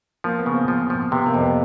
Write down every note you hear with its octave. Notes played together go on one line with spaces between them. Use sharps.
F3 A#3
B3
C#3
C4
F3
F3
C3 B3
A#3
F2
B3